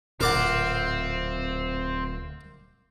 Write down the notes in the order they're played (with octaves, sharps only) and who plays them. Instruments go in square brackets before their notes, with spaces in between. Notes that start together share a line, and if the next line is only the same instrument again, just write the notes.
[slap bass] D1 A#2 [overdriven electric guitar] C4 [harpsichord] A#4 D5 F#5